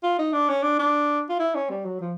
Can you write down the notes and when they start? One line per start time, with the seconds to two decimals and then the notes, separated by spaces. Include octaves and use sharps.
0.03 F4
0.19 D#4
0.33 D4
0.49 C#4
0.63 D4
0.79 D4
1.29 F4
1.39 E4
1.55 C#4
1.70 G3
1.85 F#3
2.00 F3